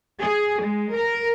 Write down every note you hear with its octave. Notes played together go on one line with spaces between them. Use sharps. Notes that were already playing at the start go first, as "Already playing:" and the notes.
G#4
G#3
A#4